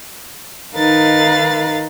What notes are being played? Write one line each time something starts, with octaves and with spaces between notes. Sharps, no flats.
D#3 D#4 A#4 B4 F5 A6